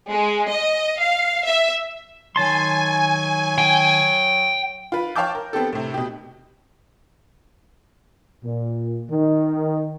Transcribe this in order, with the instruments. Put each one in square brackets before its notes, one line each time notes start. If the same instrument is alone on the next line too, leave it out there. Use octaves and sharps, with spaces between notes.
[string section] G#3
D#5
F5
E5
[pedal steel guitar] D#3 A5 C6 [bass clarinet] F#3 [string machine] G#5
[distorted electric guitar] G5
[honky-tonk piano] F4 B4
C#5 F5 G5 A5 D6 G6
A#4
B3 C4 G4 A4
A2 C3
B2 G4
[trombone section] A#2
D#3